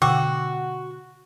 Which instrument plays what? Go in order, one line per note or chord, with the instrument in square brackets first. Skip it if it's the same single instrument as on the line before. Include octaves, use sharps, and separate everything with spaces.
[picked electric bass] B2 D3 [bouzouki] F#4 [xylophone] G5 D6 E6